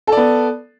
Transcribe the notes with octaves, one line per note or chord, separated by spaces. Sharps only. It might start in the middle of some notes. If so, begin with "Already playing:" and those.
B3 A4 D5